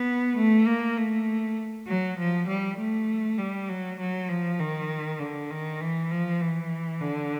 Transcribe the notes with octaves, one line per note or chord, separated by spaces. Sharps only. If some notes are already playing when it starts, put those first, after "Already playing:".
Already playing: B3
A3
A#3
A3
F#3
F3
G3
A3
G3
F#3
F#3
F3
D#3
D3
D#3
E3
F3
E3
D3